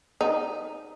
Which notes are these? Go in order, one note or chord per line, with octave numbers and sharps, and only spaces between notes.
D#4